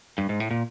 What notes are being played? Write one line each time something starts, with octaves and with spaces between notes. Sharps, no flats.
G2
G#2
A2
A#2